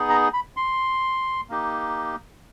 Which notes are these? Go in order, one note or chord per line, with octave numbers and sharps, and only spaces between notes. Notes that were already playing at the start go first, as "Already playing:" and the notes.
Already playing: B3 D#4 G#4
A#5
B5
C6
A#3 D#4 G4